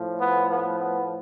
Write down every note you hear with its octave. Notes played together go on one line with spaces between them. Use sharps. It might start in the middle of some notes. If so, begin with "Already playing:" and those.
Already playing: A2 F3
B3
B3
B3